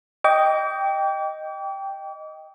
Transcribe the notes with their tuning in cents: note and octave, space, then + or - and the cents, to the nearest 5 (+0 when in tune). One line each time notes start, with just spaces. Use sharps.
D#5 +0 G5 +0 D6 -40